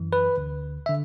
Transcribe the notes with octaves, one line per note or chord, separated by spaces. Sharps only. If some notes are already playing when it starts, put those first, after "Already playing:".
Already playing: F#2 E3
B4
D2 D3
E5
D3